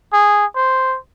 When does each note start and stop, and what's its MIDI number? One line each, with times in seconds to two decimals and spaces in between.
0.13 0.46 68
0.56 0.98 72